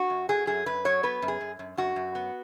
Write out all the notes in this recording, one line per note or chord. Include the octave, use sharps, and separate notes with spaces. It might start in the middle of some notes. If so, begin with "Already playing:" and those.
Already playing: F#4
F#2
F#3 G#4
F#2 G#4
F#2 B4
F#3 C#5
B3 B4
F#2
G#4
F#2
F#2
F#2 F#4
F#2
B3